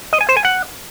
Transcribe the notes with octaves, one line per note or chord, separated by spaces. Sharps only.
D#5
G#5
C5
G#5
F#5